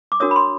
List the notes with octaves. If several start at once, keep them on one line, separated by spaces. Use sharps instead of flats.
D6
D4 F#4 A#4 C#5 D#6
B5
C6